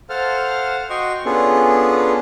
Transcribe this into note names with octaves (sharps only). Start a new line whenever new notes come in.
A4 C5 F5 F#5 A5 F6
F#4 D#5 G5 C6 C#6
B3 C#4 D4 F4 G#4 A4